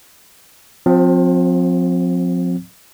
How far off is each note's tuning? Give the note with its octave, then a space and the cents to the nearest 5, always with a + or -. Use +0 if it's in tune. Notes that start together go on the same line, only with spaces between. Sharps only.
F3 +35 C4 +0